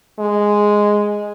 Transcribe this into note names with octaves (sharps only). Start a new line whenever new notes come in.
G#3